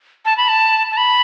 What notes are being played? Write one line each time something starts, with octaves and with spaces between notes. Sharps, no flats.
A5
B5
A5
A5
B5